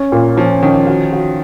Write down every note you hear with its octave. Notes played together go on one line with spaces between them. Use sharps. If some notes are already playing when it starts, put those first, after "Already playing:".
Already playing: C#4
A#2
F3 C#4
D#3 C#4
F#4
F#4